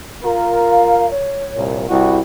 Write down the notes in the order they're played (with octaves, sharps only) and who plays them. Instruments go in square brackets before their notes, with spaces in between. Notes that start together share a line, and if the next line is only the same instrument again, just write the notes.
[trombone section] F4 A#4
[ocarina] F5
C#5
[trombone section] C2 A#2
[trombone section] C2 G3 F#4 [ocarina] E4